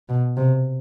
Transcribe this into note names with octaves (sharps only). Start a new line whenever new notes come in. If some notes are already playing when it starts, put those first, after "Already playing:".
B2
C3